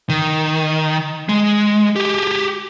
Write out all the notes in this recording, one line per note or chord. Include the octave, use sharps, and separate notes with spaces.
D#3
G#3
G4 G#4